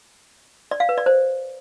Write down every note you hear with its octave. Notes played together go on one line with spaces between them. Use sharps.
D5
F5
B4
D5
C5